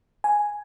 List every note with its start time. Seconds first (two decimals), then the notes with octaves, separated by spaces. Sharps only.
0.24 G#5